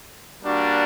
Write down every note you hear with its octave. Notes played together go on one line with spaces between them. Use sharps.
G3 A#3 D4 F#4